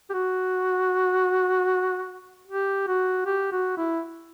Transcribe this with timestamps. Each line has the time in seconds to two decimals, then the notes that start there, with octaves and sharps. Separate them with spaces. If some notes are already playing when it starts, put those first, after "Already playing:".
0.10 G4
0.13 F#4
2.47 G4
2.88 F#4
3.26 G4
3.52 F#4
3.78 E4